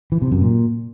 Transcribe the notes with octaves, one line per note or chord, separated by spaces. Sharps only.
E3
C3
F#2
A#2